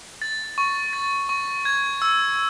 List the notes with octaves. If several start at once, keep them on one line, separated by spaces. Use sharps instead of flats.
A6
C#6
A6
C#6
G#6
E6